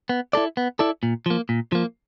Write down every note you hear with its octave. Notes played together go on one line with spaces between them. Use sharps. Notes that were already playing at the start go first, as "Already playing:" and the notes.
B3
E4 A4 D5
B3
E4 A4 D5
A#2
F3 A#3
A#2
F3 A#3